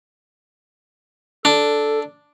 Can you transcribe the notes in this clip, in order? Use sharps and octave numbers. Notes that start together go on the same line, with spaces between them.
D4 A4